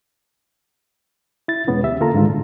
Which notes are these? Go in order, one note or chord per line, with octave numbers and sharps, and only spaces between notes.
E4 A6
E2 B2 G#3 B3 C#4
D2 G4 E5
D3 A#3 F4 A4 A#5
G#2 D3 D#3 F4
A2